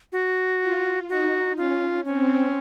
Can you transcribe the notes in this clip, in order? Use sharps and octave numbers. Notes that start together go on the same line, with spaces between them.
F#4
F4
D#4 F#4
C#4 F4
C4 C#4